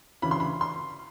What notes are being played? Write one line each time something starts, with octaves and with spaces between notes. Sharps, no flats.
D2 C#3 E3 B5
C6
B5
C6